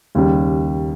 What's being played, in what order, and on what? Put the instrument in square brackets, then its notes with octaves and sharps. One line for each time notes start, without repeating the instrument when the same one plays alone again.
[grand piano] D#2 C#3 G3